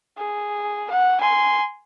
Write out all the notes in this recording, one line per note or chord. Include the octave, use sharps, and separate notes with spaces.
G#4
F#5
G#5 C6